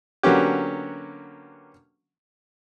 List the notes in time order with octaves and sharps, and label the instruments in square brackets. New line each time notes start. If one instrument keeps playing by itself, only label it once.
[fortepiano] D3 F#3 A#3 B3 C#4 G4